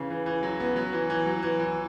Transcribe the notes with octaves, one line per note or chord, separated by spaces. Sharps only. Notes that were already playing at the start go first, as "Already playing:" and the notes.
Already playing: C#3 E3
E3
E3
F#3
B3
F#3
E3
E3
F#3
E3
E3